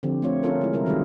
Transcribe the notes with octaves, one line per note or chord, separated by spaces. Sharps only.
D3 F3 C4 G4
A3 C4 F4 C#5
C#4 D4 F4 A4 A#4
G#3 E4
C3 G3 E4 A#4
D#3 F#3 G3 D#4 F4 G#4